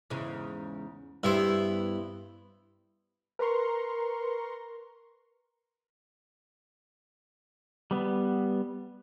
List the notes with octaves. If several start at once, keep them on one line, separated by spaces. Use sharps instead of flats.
E2 G#2 C#3
G2 B3 E4 C5 E5
A#4 B4 A#5 C6 C#6
G3 B3